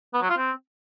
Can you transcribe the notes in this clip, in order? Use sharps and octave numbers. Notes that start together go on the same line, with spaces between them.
B3
F#3
F4
C4